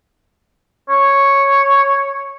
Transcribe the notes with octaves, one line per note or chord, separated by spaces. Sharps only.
C#5